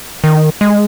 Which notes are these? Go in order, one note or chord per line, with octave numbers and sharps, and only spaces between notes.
D#3
G#3